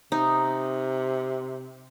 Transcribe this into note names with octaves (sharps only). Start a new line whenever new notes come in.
C3 D#4